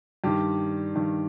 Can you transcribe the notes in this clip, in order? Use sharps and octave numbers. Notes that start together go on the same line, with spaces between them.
G2 D#3 G4
G2 D#3